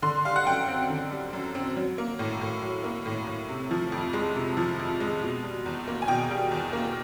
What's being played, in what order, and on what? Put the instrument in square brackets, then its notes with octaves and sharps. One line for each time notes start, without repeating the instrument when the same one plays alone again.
[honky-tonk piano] D3 C6
G3 F5
F#5
F#2 G5
C4
D3
G3
F#2
C4
F#3
A#3
A2
A2
F#3
A#3
A2
A2
C3
F3
F2
G#3
C3
F3
F2
G#3
B2
G3
E2
A#3
G#5
B2 G5
G3
E2
A#3